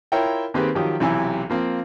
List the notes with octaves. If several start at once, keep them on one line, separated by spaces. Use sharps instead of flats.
E4 F4 A#4 C#5 E5 G5
D#3 A#3 C4 G4 G#4 B4
D#3 F3 F#3 G4 D#6
B1 C3 E3 E4 G4 G#5
F3 A#3 C4